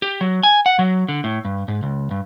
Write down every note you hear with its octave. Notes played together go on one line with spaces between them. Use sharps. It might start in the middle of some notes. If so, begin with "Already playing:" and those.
G4
F#3
G#5
F#5
F#3
D3
A2
G2
G#2
C#2
G2